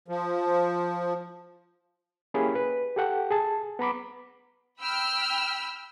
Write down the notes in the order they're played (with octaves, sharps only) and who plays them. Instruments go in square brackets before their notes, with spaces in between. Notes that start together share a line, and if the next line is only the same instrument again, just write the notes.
[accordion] F3
[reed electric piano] A#3 C#4 E4 G4 G#4 B5
B4
G4 A4 F#5 G5
G#4 A5
B3 A#5 B5 D6
[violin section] G5 B5 E6 F6